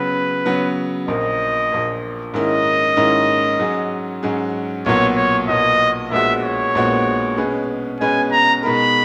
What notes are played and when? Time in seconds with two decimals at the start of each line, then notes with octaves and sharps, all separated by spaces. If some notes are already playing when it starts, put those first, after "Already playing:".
Already playing: C#3 F#3 B3 B4
0.46 C#3 F#3 B3
1.08 A#1 A#2 A#3 D#5
1.71 A#1 A#2 A#3
2.34 G#2 D#3 A#3 C#4 E4 D#5
2.97 G#2 D#3 A#3 C#4 E4
3.59 G#2 F#3 C#4 G#4
4.23 G#2 F#3 C#4 G#4
4.85 B1 A#2 F#3 B3 C#5
5.17 C#5
5.48 B1 A#2 F#3 B3 D#5
6.12 A#1 A#2 G#3 B3 F#4 E5
6.43 C#5
6.75 A#1 A#2 G#3 B3 F#4
7.37 B2 G#3 C#4 G#4 B4
8.00 B2 G#3 C#4 G#4 B4 G#5
8.32 A#5
8.63 B2 G#3 D#4 A#4 B5